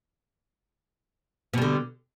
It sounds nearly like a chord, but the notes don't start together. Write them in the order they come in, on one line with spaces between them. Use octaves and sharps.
B2 G3 D3